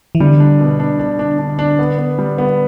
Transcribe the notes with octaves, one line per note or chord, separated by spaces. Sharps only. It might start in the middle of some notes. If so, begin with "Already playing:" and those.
E3
D3 G3
D4
B2
D4
D4
D4
D4
D4
B3
B3
G3
B3